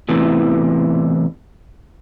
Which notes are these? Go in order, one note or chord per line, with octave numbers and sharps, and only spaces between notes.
E2 A2 C3 E3